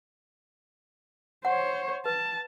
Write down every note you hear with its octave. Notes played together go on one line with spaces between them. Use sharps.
C5 C#5 F#5
B4 A5